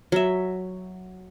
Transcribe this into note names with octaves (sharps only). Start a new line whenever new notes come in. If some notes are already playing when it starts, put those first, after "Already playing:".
F#3 E5